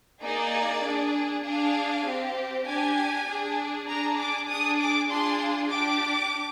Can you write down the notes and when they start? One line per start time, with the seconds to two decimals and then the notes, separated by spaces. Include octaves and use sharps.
0.22 A#3 D#4 G#4 D5
0.82 D4 G#4
1.44 D4 G#4 F5
2.05 C4 G4
2.66 D4 G4 G#5
3.27 D4 G#4
3.88 D4 G#4 A#5
4.18 D6
4.49 D4 G#4 D#6
4.79 D6
5.09 D4 F4 G#4 C6
5.71 D4 G4 D6